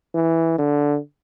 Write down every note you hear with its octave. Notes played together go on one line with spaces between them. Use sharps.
E3
D3